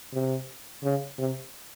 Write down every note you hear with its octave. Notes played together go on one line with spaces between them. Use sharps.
C3
C#3
C3